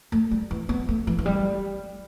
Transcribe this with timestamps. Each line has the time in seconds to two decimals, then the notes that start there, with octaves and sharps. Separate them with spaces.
0.12 A3
0.31 G3
0.51 E3
0.69 B3
0.89 A3
1.07 E3
1.19 E3
1.26 G3